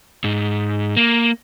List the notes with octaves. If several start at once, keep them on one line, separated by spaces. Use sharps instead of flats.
G#2
A#3